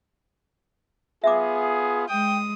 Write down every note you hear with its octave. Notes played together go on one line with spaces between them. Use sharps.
B3 F4 G#4 E5 D6
G#3 G5 D#6